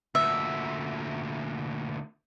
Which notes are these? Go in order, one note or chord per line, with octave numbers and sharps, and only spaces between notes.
D2 A#2 E5